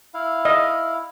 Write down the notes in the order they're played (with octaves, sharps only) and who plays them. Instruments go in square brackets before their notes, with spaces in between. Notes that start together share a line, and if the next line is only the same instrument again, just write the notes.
[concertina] E4 F5
[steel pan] D#5